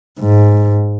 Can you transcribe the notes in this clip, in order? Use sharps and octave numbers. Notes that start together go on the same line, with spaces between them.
G#2